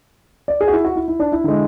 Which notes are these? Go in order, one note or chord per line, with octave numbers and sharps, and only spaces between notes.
D5
G#4
F#4
E4
F#4
E4
E4
D4
E4
D3 G#3